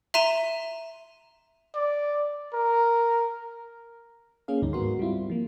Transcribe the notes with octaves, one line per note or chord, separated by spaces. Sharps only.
E5 A#5 C6 D#7 E7
D5
A#4
A#3 C#4 G#4 F5
D2 G2 D#3 D#4
G#2 B3 F#4 A#4 C6
G3 C4 E4 F4
F3 A#3